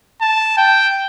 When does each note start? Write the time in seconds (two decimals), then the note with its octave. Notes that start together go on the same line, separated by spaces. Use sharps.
0.21 A5
0.57 G5